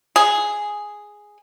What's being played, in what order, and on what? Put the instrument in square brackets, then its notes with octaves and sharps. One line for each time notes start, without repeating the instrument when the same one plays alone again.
[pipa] G#4